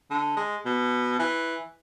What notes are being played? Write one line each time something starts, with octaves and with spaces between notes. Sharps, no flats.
D3
G#3
B2
E3